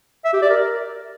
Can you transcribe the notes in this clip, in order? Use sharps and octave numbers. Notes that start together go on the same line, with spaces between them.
E5
G4
D5
A#4